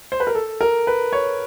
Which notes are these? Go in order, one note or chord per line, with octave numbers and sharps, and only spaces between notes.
C5
B4
A#4
A4
A#4
B4
C#5